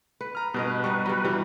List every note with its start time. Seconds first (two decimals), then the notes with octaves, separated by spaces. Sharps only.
0.21 B4
0.35 A#5 F6
0.54 G2 B2 A#4 B4 D#5
0.84 G3 D#4 C#6
1.06 F#3 G3
1.25 G2 E3 F#3 G3